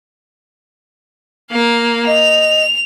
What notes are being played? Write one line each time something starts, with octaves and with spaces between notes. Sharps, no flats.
A#3 F5
D#5 F7